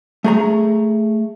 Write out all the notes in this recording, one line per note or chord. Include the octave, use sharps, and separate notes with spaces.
A3 G#4 A#5